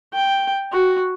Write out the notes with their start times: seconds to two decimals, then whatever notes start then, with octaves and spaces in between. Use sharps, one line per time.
0.14 G5
0.72 F#4